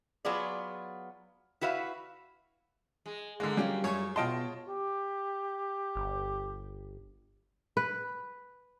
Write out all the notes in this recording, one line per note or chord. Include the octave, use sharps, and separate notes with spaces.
F#3 B3 F4 G#4 D5
E4 F#4 B4 E5 F5
G#3
D3 G#3 A#3
F#3 G3 C#4 F4 G4 G5
F#2 C#5
B2 F4 D#5 G5 A5 C6
G4
G1
B4